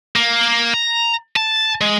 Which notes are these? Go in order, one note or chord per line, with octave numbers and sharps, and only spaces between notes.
A#3
A#5
A5
G#3